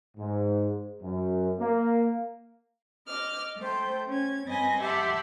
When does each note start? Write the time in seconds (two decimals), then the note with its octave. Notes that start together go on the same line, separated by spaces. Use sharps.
0.17 G#2
1.01 F#2
1.60 A#3
3.07 D#5 D6 F6
3.58 A3 C5 G5
4.08 C#4 G#6
4.47 G2 C4 B4 D#5 G#5 A#6
4.81 G4 E5 F#5 A5 C6